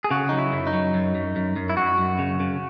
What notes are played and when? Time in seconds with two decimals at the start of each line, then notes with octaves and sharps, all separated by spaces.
0.04 G#4
0.11 C#3 F#4
0.29 F#3 D#4
0.38 E4
0.52 F#2
0.67 D#4
0.74 F#3
0.94 F#2
1.15 F#2
1.36 F#2
1.56 F#2
1.70 E4
1.77 F#2 F#4
1.98 F#2
2.19 C#3
2.40 C#3